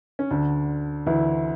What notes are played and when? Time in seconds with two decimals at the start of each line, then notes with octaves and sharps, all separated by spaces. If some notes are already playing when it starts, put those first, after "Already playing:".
0.19 C#4
0.30 D2 D3 D4
1.06 D2 D3 E3 E4